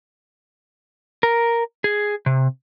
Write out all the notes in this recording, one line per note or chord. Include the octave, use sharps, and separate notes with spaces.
A#4
G#4
C3